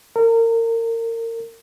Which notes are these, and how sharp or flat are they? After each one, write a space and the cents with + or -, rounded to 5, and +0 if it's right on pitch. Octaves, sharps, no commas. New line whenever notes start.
A#4 -30